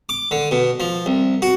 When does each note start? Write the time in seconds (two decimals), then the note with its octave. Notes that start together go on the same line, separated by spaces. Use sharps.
0.09 D6
0.31 D3
0.51 B2
0.80 F3
1.06 C2
1.42 F#4